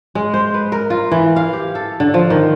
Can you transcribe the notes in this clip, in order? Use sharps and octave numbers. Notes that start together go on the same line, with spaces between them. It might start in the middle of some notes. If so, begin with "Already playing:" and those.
G#3
C5
B4
A#4
F4
E3
F5
G4
A4
D3
F3
D#3